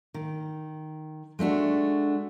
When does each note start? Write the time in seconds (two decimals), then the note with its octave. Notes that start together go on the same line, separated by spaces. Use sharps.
0.14 D#3
1.39 G#3 A3 D4 F#4